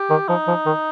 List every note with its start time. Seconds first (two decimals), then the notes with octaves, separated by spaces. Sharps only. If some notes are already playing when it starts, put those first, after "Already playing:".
Already playing: G4
0.10 D#3
0.28 F3 D#4
0.47 F3
0.66 D#3